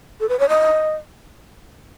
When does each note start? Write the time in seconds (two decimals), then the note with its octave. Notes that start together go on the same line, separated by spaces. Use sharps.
0.20 A4
0.29 B4
0.39 C#5
0.49 D#5